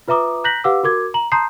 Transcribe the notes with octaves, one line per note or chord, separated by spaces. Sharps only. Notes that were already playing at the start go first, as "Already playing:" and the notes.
F4 B4 E5 A#5 D6 D#6
A#5 F#6 G6 A#6 B6 F#7
G4 B4 F5 F#5 D6 E6
F#4 A#4 D6 G#6
A#5 F#7
A5 A#5 C6 D#6 G6 C7